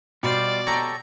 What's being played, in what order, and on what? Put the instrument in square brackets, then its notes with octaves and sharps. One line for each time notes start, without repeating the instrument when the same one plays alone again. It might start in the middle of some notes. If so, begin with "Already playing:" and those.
[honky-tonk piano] B2 [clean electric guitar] G3 F4 C5 [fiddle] D5
[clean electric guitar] G4 A4 C#5 [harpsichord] A#5